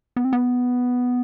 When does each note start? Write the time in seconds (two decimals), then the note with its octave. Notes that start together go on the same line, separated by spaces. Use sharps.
0.16 B3
0.25 C4
0.33 B3